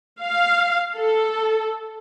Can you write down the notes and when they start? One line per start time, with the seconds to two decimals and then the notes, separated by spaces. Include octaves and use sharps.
0.23 F5
0.97 A4